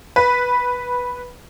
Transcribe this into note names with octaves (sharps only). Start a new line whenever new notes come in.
B4